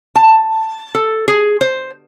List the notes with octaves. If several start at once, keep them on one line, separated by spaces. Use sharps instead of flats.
A5
A4
G#4
C5